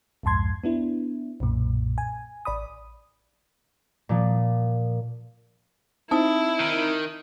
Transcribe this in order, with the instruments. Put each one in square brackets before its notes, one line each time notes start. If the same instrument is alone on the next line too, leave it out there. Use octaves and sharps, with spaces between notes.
[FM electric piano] C2 F2 G#2 A5 C6 G#6
B3 D4 E4
B1 F#2 A#2
G#5
A1 D5 B5 D#6
[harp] A#2 F3
[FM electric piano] C4 D#4 [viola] E4 [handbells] A5 D#6
[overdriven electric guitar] D#3